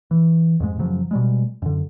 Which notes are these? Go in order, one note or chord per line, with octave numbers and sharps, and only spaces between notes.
E3
F2 G#2 G#3
F#2 C#3 F3 F#3
B2 G3 G#3
F#2 D3